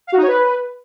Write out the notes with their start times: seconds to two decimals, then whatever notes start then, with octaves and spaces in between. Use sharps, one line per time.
0.07 F5
0.12 F#4
0.17 D#4
0.23 C#5
0.28 B4